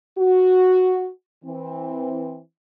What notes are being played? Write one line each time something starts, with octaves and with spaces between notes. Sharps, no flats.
F#4
E3 C4